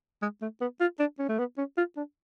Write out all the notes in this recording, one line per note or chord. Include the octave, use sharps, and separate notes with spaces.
G#3
A3
B3
F4
D4
C#4
A3
B3
C#4
F4
D4